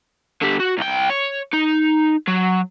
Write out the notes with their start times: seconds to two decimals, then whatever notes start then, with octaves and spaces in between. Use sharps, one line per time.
0.41 D3 G4
0.60 F#4
0.78 C2 G5
1.09 C#5
1.53 D#4
2.28 F#3